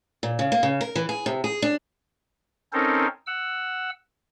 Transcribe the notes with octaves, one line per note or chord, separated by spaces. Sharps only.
A#2
C#3
A#3
C#3
A#4
E3
G#4
C3
G#4
D4
C4 C#4 D#4 A4 A#4 C5
F#5 E6